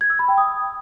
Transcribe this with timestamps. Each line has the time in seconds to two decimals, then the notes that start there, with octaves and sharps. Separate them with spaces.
0.01 G#6
0.10 E6
0.19 B5
0.28 G5
0.38 D#6